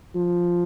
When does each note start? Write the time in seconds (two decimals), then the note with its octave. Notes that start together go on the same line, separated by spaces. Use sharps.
0.15 F3